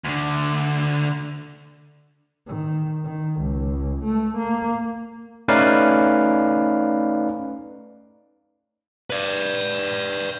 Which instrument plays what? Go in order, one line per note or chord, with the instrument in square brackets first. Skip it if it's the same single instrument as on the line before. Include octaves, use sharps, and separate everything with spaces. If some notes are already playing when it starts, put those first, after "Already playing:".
[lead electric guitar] D2 D3
[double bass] D#3
D#3
C#2
A3
A#3
[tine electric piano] A3 C#4 D#4 B4 D5 F5
[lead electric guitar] B4 D5